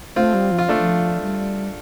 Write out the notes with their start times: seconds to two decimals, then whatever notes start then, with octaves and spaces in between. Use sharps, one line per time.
0.16 A3 C4 F4
0.34 G3
0.51 F3
0.58 F4
0.69 A3 D4
0.79 F3
1.22 G3